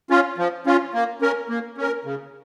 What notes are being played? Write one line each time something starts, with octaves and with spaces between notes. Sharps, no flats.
C#4 F4
F3
C#4 F4
A#3
C#4 A#4
A#3
C#4 A#4
C#3